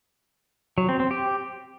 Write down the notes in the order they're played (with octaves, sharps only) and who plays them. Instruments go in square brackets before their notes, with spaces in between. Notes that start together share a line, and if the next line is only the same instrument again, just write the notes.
[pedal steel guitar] F#3
C4
C4
G4